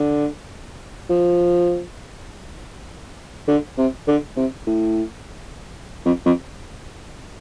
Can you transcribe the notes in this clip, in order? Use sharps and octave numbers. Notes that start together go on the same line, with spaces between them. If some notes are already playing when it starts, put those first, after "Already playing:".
Already playing: D3
F3
D3
C3
D3
C3
A2
F2
F2